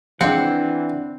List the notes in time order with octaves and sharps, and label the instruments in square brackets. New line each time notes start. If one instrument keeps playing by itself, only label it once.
[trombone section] E3 [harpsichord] F3 G#3 [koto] C4 [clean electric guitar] D4 F#5